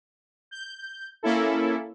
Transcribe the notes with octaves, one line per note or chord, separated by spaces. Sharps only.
G6
A#3 C#4 E4 A4